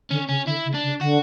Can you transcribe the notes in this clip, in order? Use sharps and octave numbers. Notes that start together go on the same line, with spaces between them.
D3 C#4
C#3 C#4
D3 E4
C#3
D4
C#3
D3 F#4